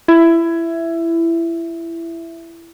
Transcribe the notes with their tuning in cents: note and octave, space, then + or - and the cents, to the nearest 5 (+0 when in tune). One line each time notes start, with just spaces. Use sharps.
E4 +20 E5 +5